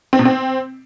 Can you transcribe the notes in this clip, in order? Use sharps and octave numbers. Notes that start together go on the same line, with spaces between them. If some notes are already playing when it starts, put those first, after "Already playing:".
C4
B2
C4